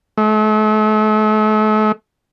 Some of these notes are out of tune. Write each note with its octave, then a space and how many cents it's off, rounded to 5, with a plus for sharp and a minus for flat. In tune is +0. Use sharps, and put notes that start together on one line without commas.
A3 -40